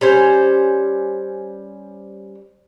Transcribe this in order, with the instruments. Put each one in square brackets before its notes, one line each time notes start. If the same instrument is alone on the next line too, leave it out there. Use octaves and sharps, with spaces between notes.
[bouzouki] G3 C#4 C5